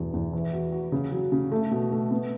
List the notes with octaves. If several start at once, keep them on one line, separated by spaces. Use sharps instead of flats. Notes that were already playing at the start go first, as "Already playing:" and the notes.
Already playing: E2 B2
E2
E3
F#4
F#4
C#3
F#3
C#3
A3
B2
A3
B3